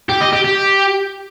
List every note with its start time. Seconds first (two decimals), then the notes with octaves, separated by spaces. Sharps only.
0.09 G4
0.21 D#5
0.33 G4
0.45 G4